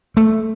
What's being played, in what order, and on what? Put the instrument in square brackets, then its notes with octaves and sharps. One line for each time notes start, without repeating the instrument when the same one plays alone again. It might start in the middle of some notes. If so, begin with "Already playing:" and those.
[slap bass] A3